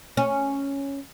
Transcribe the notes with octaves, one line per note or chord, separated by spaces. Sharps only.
C#4